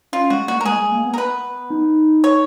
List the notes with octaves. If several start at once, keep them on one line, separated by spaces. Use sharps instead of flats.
C#4 F4
G#3 F#4
A#3 F#4
A#4
G#3 G#4
G#3
A#3
B3
A#4
B4
D#4
C#5